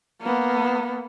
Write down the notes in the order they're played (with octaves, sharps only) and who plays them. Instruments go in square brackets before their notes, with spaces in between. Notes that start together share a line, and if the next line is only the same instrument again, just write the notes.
[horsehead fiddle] A#3 B3